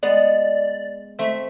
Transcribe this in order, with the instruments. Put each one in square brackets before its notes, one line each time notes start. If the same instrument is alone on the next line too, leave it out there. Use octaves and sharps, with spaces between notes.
[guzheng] G#3 B3 [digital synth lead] D5
[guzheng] A3 C4 [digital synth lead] E5